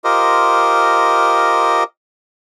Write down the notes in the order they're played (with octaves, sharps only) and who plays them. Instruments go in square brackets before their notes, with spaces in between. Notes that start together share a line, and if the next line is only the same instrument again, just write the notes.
[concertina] F4 G4 A#4 C5 D#5